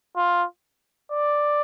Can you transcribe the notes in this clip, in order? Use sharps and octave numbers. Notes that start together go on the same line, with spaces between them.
F4
D5